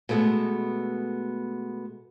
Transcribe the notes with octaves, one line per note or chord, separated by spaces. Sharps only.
B2 G#3 A3 B3